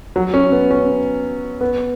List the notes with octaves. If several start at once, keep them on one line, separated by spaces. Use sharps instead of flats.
F#3
C#4
B3
C#4
B3